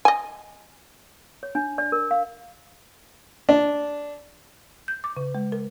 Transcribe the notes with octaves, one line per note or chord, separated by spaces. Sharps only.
D#5 G#5
C#5
D4
D5
A#4
F5
D4
G6
D6
C#3
G#3
A#4